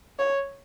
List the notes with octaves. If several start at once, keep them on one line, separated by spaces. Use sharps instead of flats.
C#5